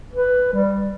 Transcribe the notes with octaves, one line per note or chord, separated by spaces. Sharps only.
B4
G3